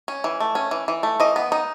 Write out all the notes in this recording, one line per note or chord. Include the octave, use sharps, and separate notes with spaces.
C#4
E3
A3
C#4
E3
E3
A3
E3 D#5
B3
D#4